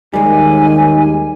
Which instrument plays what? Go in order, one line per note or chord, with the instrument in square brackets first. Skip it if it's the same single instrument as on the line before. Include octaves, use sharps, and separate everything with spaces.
[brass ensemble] D#2 [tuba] D#3 [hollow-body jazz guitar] G3 G#3 [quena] G#5